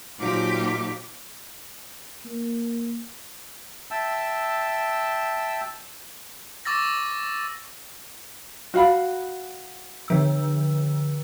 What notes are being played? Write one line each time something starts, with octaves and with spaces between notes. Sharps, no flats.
A#2 F3 F#3 D#4 G4 D6
A#3
E5 G5 A5 E6
C#6 D6 E6 A6 A#6
F#4 F5 B5
D3 F3 E6